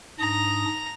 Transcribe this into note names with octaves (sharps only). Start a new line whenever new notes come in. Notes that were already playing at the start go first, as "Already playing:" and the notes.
G#2 D4 A#5 D#6